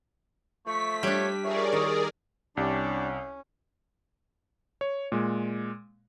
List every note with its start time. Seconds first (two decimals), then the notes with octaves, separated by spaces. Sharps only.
0.66 F3 A3 C#6 B6
1.03 G3 D4 C#5
1.43 F3 G#4 A#4 C#5 D5 E5
1.73 D#3 D#6
2.57 C2 G3 C#4 D4 G4
4.81 C#5
5.12 A#2 G#3